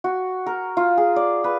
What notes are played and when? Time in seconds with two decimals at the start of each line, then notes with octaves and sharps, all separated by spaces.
0.04 F#4
0.46 A#4
0.77 F4
0.97 G#4
1.16 D5
1.44 B4